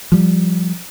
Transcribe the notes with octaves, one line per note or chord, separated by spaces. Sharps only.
F3 G3